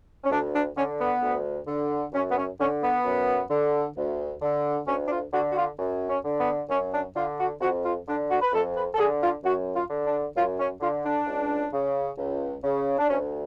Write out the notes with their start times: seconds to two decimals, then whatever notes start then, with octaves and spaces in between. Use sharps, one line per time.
0.24 C#4
0.31 D2 D4
0.53 D4
0.77 D3 C#4
0.99 B3
1.22 D2
1.67 D3
2.13 F#2 C#4
2.30 B3
2.36 C#4
2.59 D3 C#4
2.82 B3
3.05 F#2
3.50 D3
3.96 D2
4.42 D3
4.87 D2 C#4
5.06 D4
5.10 F4
5.33 D3 F#4
5.50 F#4
5.56 F4
5.79 F#2
6.09 C#4
6.24 D3
6.39 B3
6.69 F#2 C#4
6.93 D4
7.15 D3 F4
7.39 F#4
7.61 F2 F#4
7.84 F4
8.08 D3 D4
8.30 F#4
8.42 B4
8.52 F2 A4
8.75 B4
8.94 A4
8.98 D3 G#4
9.22 F4
9.44 F#2 F#4
9.74 F4
9.90 D3
10.05 D4
10.36 F#2 F4
10.58 C#4
10.80 D3 F4
11.04 D4
11.27 C#2
11.72 C#3
12.18 C#2
12.64 C#3
12.99 D4
13.09 D2 C#4